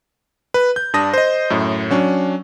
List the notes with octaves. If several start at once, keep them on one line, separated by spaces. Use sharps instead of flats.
B4
G6
G2 D4 A5 D#6 A#6
C5 D#5
F#2 A2
F#3 C#4 D4